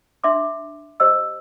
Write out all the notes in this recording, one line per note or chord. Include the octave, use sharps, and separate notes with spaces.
D4 E5 C6 D6
G4 C5 D#5 E6